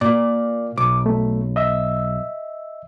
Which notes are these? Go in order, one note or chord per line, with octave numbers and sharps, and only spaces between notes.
A#2 D5
B1 D6
A3
D#5 E5 E6